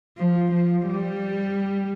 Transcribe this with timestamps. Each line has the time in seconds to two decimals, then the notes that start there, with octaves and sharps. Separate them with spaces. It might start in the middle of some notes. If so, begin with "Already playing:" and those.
0.18 F3
0.52 F3
0.86 G3